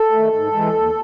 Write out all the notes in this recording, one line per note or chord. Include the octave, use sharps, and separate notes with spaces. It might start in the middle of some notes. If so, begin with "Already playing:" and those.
Already playing: A4
D#3 A3
G#2
E3 G#3
D#2